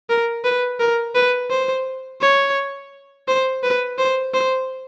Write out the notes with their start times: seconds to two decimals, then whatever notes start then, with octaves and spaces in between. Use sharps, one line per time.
0.10 A#4
0.45 B4
0.80 A#4
1.15 B4
1.50 C5
2.21 C#5
3.28 C5
3.63 B4
3.98 C5
4.34 C5